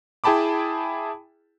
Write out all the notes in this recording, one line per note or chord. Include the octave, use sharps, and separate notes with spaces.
E4 G#4 G5 A5 B5 D6